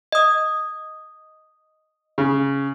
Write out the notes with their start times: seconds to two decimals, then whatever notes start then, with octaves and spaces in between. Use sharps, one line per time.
0.12 D#5 D#6
2.18 C#3